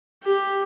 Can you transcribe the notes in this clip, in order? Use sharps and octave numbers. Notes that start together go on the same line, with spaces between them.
G4